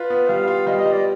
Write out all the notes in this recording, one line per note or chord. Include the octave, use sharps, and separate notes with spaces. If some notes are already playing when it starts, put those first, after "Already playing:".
Already playing: F4 B4
B3
G3 F5
F4
G3 D#5
D#5
G3
D5